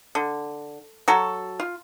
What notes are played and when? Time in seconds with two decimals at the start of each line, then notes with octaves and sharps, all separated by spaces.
0.15 D3
1.08 F#3 F#4 A4
1.60 F4